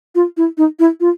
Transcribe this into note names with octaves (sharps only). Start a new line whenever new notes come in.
F4
E4
D#4
E4
F4